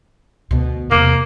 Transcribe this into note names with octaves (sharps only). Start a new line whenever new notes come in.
D2 B2
E2 C3 A#3